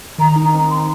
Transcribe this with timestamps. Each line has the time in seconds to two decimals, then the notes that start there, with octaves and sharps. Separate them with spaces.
0.18 D#3 A#5
0.36 D#4
0.53 C4
0.71 C6